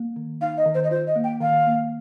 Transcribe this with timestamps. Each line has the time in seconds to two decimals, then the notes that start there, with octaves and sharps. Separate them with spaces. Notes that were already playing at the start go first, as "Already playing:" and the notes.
Already playing: A#3
0.16 D#3
0.41 D#4 F5
0.57 D#5
0.66 D#3
0.74 C5
0.84 D#5
0.91 F4 C5
1.07 D#5
1.16 A#3
1.24 G5
1.41 D#3 F5
1.67 A#3